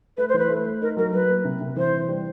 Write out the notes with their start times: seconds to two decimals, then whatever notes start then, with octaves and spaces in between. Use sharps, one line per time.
0.17 A3 B4
0.28 C5
0.34 E3 B4
0.49 A3
0.65 A3
0.81 D#4 A#4
0.97 F#3 A#4
1.13 F#3 B4
1.29 A#3
1.45 C3
1.61 C3
1.76 E3 C5
1.93 E3
2.08 G3